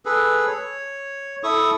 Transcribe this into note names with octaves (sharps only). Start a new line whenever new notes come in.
G#4 A4 B4
C#5
E4 A4 C#6 D#6